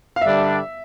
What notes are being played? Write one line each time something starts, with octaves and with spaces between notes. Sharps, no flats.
F5
G2 D3 G3 D4 E5